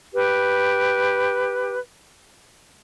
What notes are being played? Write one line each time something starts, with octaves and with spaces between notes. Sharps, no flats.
G4 B4